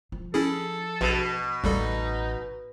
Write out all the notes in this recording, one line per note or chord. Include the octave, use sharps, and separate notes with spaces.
F3
C#4 E4 G#4 A4
A#1 B2
A1 D#2 G3 D#4 A4